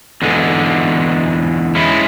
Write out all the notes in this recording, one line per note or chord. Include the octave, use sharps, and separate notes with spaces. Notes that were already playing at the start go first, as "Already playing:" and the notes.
E2 D3 G#3
G#3 C#4 E4